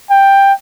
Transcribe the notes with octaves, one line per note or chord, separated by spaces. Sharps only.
G5